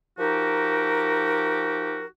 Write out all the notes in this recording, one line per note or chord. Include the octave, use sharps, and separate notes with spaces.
F3 D#4 F#4 G4 A#4